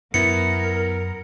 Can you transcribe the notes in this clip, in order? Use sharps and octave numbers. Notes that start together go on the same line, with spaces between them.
F#2 B3 E4 A#4 C#7